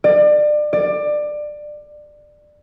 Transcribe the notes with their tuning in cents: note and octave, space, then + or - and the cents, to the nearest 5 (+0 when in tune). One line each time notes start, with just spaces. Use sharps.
D5 +30
D5 +20